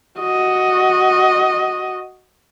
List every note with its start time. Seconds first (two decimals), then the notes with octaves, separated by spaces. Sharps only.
0.20 F#4 D#5